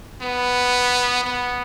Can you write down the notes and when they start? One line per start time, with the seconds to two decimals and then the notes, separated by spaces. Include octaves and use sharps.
0.22 B3
1.24 B3